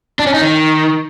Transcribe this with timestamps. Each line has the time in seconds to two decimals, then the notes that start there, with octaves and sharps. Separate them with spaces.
0.19 D4
0.27 C#4
0.34 D#4
0.41 D#3